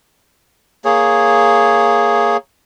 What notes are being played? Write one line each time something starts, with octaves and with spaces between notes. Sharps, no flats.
A#3 G#4 C#5